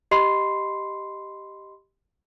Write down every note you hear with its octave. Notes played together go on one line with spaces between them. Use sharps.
G4 D#5 B5 C6 C7